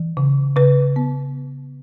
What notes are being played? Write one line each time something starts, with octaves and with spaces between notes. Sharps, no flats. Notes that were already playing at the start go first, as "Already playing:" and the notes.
Already playing: E3
C#3
C#3 B4
B3